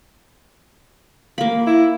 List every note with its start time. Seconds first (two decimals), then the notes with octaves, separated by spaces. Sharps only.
1.38 A#3 F5 B5
1.67 E4